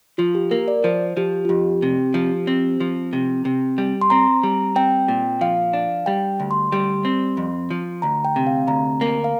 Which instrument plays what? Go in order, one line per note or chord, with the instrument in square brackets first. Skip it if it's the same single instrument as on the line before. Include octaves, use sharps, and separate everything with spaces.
[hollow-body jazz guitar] F3 [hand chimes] F4
[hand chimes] G4
[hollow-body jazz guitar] A#3 [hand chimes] A#4
[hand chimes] D5
[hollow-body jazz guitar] F3 [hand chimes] C5
[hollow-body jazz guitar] F3 [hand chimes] G4
[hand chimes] F4
[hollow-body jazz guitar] F2 [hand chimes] G4
[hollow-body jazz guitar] C3
F3
C4
F3
C3
C3
G3
[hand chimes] C6
[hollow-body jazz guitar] C4 [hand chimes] A#5
[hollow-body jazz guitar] G3
[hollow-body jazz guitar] C4 [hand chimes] G5
[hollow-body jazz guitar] A#2
[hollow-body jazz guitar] F3 [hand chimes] F5
[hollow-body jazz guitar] D4
[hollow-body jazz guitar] G3 [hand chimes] G5
[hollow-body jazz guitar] D2
[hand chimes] C6
[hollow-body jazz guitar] G3
C4
F2
F3
[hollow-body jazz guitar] D2 [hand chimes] A#5
[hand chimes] G5
[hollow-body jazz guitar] C3
[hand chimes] F5
[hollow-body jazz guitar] D2 [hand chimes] A#5
[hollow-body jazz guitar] A#3
[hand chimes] F5